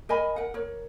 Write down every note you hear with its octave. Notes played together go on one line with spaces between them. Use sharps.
A#4 D#5 G#5 B5
A#4 F#5
A#4 C#5